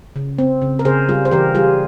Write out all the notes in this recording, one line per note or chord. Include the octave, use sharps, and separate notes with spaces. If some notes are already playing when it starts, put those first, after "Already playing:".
C#3
C4
C#3
A#4
C#3 G#4 C5
G3 F4 G#4
C5
E3 G4 A#4
G3 F4 G#4